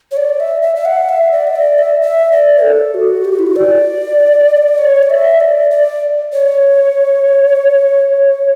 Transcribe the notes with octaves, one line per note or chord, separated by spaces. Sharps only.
C#5
D5
E5
E5
E5
F#5
E5
D5
E5
D5
E5
E5
D5
A4
F#4
G4
F#4
E4
F#4
D5
C#5
D5
E5
D5
D5
C#5